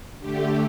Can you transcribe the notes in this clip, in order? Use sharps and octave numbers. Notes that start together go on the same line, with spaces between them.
D3 A3 G4